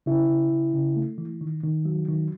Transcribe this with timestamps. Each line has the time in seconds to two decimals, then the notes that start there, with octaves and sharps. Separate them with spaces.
0.06 C#3 E4
0.29 C#3
0.51 C#3
0.74 C#3
0.96 A3
1.18 E3
1.41 D#3
1.63 D#3
1.85 F#3
2.08 D#3